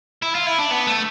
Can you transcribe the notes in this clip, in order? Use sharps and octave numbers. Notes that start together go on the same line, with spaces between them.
E4
F4
E4
D4
B3
A3